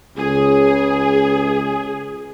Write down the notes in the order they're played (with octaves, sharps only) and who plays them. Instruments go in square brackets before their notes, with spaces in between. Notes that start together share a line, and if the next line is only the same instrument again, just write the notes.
[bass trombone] C#2 [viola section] G#4